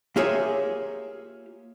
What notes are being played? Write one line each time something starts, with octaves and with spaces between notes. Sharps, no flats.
A#3 F4 G4 G#4 C#5 E5